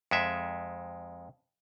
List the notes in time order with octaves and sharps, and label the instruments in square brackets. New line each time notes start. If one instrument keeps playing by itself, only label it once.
[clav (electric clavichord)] F2 G#3 E5